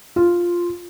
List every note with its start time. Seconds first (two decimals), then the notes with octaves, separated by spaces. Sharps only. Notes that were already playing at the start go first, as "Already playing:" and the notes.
0.16 F4